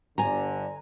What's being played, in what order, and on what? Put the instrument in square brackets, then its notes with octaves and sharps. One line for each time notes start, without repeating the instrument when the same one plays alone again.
[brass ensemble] G1 D3 [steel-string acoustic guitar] G#5 A#5